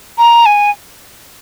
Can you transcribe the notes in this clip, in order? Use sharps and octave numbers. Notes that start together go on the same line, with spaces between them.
A#5
G#5